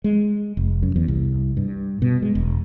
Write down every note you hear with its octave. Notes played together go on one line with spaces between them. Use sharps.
G#3
F1
F#2
E2
C2
G2
B2
G#3
E1